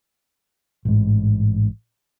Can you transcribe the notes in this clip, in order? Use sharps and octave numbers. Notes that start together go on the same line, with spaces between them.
A1 G#2